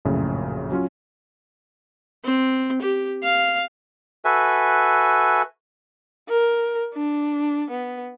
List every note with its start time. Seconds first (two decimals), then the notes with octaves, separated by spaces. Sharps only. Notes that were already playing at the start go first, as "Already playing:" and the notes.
0.05 A#1 F#2 A2 C#3
0.72 F#3 C#4 F4
2.24 C4
2.82 G4
3.23 F5
4.25 F#4 A4 B4 E5 G#5
6.29 A#4
6.94 D4
7.70 B3